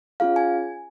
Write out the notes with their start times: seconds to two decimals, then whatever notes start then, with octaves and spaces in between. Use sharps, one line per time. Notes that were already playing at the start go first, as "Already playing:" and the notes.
0.20 C#4 F4 G#4 F5
0.36 G#5